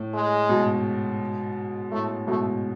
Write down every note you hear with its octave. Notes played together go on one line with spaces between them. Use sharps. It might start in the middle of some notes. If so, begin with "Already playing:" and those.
Already playing: A2
G#3
G#2 B2
A2 A3
G#2 B2 A3